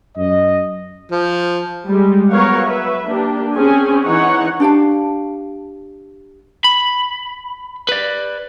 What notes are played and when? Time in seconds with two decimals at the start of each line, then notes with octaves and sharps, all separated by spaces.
0.17 F#2 D#5
1.11 F3
1.88 G3 G#3
2.31 F#3 B3 A#4 C#5 F5 F#5
2.64 B4 E5
3.06 A#3 D4 G4
3.55 C4 C#4 G#4 G#5
4.03 E3 D#4 C#5 F#5
4.60 D4 G4 F5 A5
6.64 B5
7.89 B4 D5